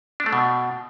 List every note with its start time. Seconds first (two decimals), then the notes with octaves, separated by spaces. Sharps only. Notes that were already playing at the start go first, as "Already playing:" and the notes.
0.20 D4
0.26 A3
0.33 B2